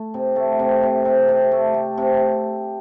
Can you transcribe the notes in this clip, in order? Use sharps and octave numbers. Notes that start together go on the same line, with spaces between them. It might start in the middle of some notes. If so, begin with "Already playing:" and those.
Already playing: A3
C3
A3
C3
C3
C3
C3
A3
A3
C3